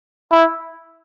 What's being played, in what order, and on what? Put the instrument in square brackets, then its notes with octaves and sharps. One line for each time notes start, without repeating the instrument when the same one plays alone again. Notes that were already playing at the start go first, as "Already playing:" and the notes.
[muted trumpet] E4